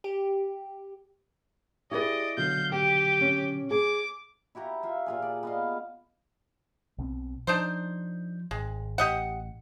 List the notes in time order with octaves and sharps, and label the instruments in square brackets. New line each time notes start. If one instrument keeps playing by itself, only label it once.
[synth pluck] G4
[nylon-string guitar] E4 G#4 B4 [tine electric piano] G4 [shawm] D5 [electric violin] D#5
[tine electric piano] B2 D3 F#3 [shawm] F5 [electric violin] G6
[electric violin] G4 [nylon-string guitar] G5 [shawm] D6
[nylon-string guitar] C#4
[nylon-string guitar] G#4 [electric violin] D6
[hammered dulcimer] E4 F#4 G4 A#5
F4 E5
A#2 F4 G#4
D5
B3 D#5 F5
[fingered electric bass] B1 B2 C4
[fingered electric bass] F3 [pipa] D4 D#4 C5
[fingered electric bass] G#1 [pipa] G#3
[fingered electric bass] A1 [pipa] G4 D#5 F#5